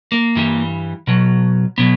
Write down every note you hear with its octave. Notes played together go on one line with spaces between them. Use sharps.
A#3
G2 E3 G3
B2 F#3
B2 F#3 B3